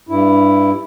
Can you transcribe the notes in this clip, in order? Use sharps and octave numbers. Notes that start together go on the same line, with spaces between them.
G2 E4